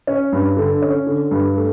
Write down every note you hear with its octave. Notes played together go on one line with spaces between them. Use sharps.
C#4
G2
D3
C#4
D3
G2
A3